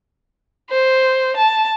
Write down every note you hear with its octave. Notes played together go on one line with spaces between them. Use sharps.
C5
A5